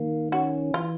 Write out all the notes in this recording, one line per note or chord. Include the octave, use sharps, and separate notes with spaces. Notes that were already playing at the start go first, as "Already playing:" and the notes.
Already playing: D#3 A#3
C#4 F#4
E3 F4